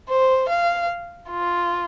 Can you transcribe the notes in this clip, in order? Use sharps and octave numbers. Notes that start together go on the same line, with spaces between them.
C5
F5
F4